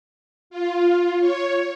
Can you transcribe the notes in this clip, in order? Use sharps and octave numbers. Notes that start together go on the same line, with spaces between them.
F4
C#5